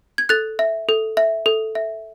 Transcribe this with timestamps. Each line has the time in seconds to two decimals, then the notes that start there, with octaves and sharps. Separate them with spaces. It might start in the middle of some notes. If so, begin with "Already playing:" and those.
0.18 G#6
0.29 A4 F#6 A6
0.59 E5
0.89 A4
1.17 E5
1.46 A4
1.75 E5